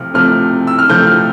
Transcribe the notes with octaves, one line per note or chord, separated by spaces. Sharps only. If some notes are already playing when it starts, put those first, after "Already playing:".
Already playing: C3 F3 A3 C4 F6
C3 F3 A3 C4 F6
E6
F6
C3 F3 A3 C4 G6
F6